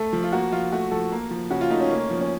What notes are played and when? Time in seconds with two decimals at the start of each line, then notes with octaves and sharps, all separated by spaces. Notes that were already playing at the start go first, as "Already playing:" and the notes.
Already playing: A3 A4
0.13 F3
0.23 F4
0.32 A#3 F#4
0.52 F3 F4
0.72 A3 F#4
0.91 F3 A4
1.12 A#3
1.31 F3
1.50 C#3 F#4
1.61 F4
1.70 A3 D#4
1.81 C#4
1.90 A#3
2.11 F3
2.20 C#4